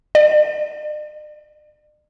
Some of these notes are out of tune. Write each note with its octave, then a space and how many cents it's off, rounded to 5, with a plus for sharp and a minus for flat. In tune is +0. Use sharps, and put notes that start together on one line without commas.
D5 +45